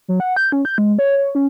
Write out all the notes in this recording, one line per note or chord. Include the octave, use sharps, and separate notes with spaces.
F#3
F#5
G6
C#4
G6
G#3
C#5
C#5
C#4